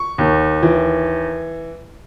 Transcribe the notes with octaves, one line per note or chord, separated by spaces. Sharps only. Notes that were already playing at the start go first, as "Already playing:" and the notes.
Already playing: C#6
D#2
E3